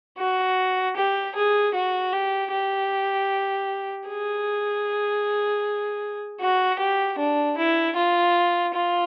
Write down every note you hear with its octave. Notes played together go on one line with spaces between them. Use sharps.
F#4
G4
G#4
F#4
G4
G4
G#4
F#4
G4
D4
E4
F4
F4